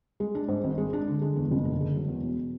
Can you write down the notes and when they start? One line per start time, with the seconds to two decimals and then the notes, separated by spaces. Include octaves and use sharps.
0.20 G#3
0.35 D4
0.48 G#2
0.64 G#1
0.78 G#3
0.93 D4
1.08 D3
1.22 G#3
1.36 E2
1.51 F#1
1.65 D3
1.80 G#3
1.95 F#3
2.08 E2
2.23 B2